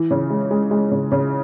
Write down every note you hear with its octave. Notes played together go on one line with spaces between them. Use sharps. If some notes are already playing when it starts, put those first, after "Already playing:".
Already playing: E3
C#3
G#3
G#3
G#3
C#3
C#3